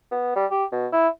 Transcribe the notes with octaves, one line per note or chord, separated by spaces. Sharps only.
B3
G3
G4
B2
E4